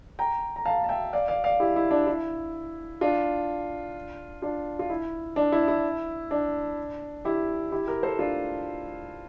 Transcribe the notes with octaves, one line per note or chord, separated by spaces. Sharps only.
G5 A#5
A#5
F5 A5
A5
E5 G5
D5 F5
D5 F5
D5 F5
E4 G4
E4
D4
E4
D4 F4
D4 F4
F4
E4
D4
E4
E4
D4
E4 G4
E4 G4
G4 A#4
A4 C5
D4 F4